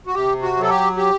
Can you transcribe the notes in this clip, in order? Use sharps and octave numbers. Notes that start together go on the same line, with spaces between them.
F#4
C3 G4
F#4
F#3
A4
G4
G4